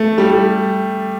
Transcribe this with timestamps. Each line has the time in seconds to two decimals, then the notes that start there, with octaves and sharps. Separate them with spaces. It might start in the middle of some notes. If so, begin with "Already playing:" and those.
Already playing: A3
0.18 G3
0.30 G3